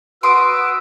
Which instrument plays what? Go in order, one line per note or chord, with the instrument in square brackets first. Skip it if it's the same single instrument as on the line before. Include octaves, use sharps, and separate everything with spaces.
[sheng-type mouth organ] F#4 B4 [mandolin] E5 C6 [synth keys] D#6 D7 [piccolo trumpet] E6